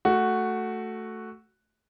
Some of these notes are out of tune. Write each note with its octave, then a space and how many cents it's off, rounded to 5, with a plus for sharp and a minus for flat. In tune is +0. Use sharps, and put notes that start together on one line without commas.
A3 +0 F#4 +0